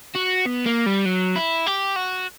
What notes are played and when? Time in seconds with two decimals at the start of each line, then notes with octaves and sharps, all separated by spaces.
0.16 F#4
0.46 B3
0.66 A#3
0.86 G3
1.05 F#3
1.36 E4
1.66 G4
1.96 F#4